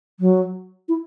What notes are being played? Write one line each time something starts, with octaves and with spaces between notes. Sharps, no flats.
F#3
E4